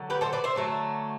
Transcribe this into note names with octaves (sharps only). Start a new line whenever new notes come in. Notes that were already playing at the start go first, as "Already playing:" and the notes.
Already playing: D3 F#3
G4 B4
A4 C5
B4 D5
C5 E5
D3 F#3 A3